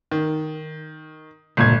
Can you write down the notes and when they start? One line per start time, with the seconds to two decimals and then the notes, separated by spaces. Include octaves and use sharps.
0.11 D#3
1.57 G1 C#2 A#2 G#6